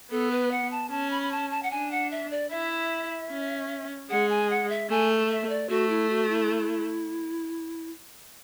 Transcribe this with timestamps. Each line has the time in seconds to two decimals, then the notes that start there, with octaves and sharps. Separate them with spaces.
0.11 B3 A4
0.31 B4
0.52 F#5
0.71 A5
0.91 C#4 A5
1.11 B5
1.22 B5
1.32 A5
1.50 A5
1.63 F#5
1.71 D4 G#5
1.91 F#5
2.11 E5
2.31 D5
2.50 E4 E5
3.31 C#4
4.10 G#3 F#5
4.30 G#5
4.51 F#5
4.69 E5
4.89 A3 G#5
5.30 E5
5.49 D5
5.69 A3 F#4
5.89 E4
6.10 F#4
6.29 E4